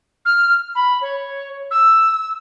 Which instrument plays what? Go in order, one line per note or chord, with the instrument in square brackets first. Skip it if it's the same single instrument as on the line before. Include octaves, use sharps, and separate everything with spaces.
[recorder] F6
B5
C#5
E6